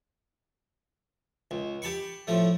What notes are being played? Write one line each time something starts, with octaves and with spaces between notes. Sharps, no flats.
C#2
G4 A5 B5 C#6
A2 F3 A3